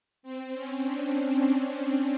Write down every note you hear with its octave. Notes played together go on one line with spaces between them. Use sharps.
C4
C#4
D4